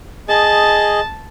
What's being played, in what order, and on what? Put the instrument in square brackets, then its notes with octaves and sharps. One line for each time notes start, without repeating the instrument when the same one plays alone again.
[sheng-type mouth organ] G#4 D#5 [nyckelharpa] A5